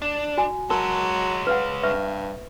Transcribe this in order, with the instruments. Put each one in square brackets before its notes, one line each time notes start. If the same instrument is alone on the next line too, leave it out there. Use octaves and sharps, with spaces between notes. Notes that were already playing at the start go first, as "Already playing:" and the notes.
[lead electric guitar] D4
[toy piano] F#4 G#5
[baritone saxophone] F#3 [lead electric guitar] G#3 C#4 [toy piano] A#4 A5
[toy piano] B4 F5 F#5
[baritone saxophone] G2 [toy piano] B4 E5 C#6